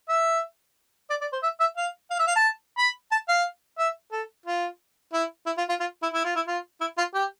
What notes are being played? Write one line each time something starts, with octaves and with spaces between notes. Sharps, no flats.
E5
D5
D5
C5
E5
E5
F5
F5
E5
F5
A5
B5
A5
F5
E5
A4
F4
E4
E4
F4
F4
F4
E4
E4
F4
E4
F4
E4
F4
G4